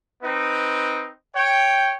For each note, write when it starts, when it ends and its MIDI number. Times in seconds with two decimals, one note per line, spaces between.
0.22 1.09 60
0.22 1.09 63
0.22 1.09 71
1.34 1.95 73
1.34 1.95 79